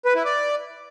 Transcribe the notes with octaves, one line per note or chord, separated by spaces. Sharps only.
B4
E4
D5